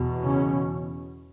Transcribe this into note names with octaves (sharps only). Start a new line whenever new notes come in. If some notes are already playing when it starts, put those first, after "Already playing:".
Already playing: E2 B2
C#3 C#4